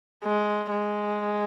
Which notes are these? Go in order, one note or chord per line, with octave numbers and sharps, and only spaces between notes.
G#3
G#3